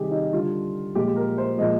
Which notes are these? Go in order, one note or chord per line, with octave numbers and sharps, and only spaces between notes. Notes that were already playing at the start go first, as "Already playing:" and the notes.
Already playing: C3 D#3 G3 G4 G#4
D#4
D3 G3 F4
A#2 F3 G#3 G4
A#4
C5
A#2 F3 G#3 D#5